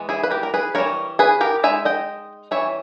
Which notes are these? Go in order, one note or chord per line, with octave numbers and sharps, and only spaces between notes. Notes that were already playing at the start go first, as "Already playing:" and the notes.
Already playing: E3 G#3 B3
E4 G#4
B4
G4 A#4
A#4
G#4 B4
E3 G3 B3 D#4 A#4 C#5
G#4 B4
G4 A#4
G#3 D#4 E5 G#5
D#5 G5
E3 G3 C#4 C#5 E5